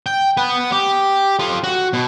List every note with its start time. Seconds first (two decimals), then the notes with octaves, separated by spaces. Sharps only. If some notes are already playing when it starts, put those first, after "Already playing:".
0.06 G5
0.37 B4 F#5
0.72 G4
1.39 F4 A4
1.64 F#4
1.93 B2